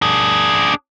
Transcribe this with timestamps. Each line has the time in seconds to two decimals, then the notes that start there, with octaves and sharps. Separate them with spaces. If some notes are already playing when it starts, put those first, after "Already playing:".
0.02 D4 G#4